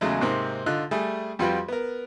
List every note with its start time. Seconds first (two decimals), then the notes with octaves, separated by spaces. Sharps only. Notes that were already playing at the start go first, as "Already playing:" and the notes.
0.01 E2 C#3 F#3 G#3 A3
0.21 G#2 C3 A#3 C4
0.66 D3 D#4 F4 F#6
0.91 G3 A3 G#4
1.39 F2 G3 F4 F#4 B4 G5
1.69 B3 A#4